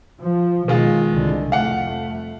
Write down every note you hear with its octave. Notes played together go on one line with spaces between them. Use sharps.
F3
B2 D#3 G#3 F4
C2 G#2 D3
F2 A3 F5 F#5